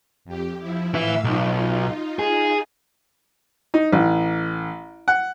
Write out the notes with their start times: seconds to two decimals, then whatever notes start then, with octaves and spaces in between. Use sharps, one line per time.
0.25 F2 G4
0.60 F3 E4
0.94 A2 E3 E4 F5 E6
1.24 B1 D#4 F4
2.19 G#4
3.74 D#4
3.92 A1
5.08 F#5